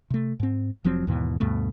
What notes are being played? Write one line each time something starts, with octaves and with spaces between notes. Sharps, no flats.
C3 A3
G#2 C4
F1 F3 F#3 C4
D#2 G#2 B2 E3
D2 G2 B2 A3